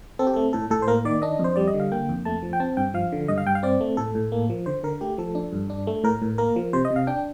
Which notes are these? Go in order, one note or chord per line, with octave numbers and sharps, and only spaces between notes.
C4 A4
G4
A3 A4
A2 A4
A2 A4
C5
A#3 A#4
D#3 D5
D4 D#5
F2
C5
G3 D5
D#5
D3
F5
A#3 G5
F2
A3 A5
F3
G5
C4 A5
G2 G5
F3 F5
D3
G2 D#5
F5
G2 G5
F5
C4 D5
A3
A2 A4
A2
A#3
F3
D3 C5
D3 A#4
A3 G4
F3 A4
D4
G2
D4
A3
A2 A#4
A2
A#3 A#4
F3
C3 C5
D#5
C3
F5
D4 G5